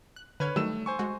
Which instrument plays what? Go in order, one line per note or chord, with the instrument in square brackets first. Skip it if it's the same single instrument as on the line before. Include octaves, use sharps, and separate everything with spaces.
[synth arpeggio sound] F#6
[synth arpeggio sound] D3 F6 G#6 [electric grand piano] B4 C#5
[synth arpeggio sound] D#3 F#3 G3 [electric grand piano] A3 E6 E7
[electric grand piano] C5 G#5 C#6
[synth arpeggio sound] G#3 F#4